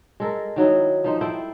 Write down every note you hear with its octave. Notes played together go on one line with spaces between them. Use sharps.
G#3 A4 A#4
D#3 F#3 D#4 E4
F3 D#4 C5
E4 A4 C5 G5